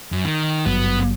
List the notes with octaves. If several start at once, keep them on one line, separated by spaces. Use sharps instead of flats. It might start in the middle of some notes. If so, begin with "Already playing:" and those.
F#2
D#3
G#1 G2 F#3 B3